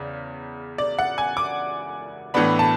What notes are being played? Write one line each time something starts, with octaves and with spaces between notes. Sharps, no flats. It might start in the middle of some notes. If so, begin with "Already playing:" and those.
Already playing: E2 C#3 D5
D5
F#5
G#5
D6
A2 E3 B3 D4 B5
A5